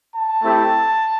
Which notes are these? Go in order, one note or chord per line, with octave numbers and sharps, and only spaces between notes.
A5
A3 C4 E4 G4